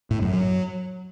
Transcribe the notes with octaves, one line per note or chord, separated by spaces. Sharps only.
A2
F#2
F#3